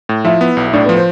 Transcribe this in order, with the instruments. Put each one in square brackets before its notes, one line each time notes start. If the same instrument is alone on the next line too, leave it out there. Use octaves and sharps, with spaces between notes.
[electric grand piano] A2
[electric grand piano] F3 [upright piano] E4 E5
[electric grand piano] B3
B1
[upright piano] E5
[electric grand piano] A2 [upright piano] D4 D5
[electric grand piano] F3 [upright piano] B3 B4
[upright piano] C5